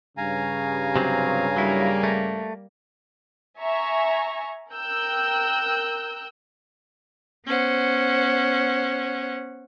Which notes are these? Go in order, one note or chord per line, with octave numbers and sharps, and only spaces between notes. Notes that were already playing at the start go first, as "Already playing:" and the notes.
G2 C#3 F5 G#5 A#5
C3 F#3 C4
F#3 G3 A#3 E4
A3
E5 G#5 A#5 C#6
A#4 G5 E6 F#6 G6
B3 C#4 C5 F#5